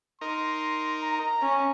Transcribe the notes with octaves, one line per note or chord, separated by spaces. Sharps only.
D#4 A#4 C6
A#5
C#4